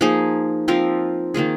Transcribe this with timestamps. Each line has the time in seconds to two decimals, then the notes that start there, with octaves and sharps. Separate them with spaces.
0.01 F3 A#3 D#4 G#4
0.68 F3 C4 F4 A#4
1.34 D#3 A#3 F4 G#4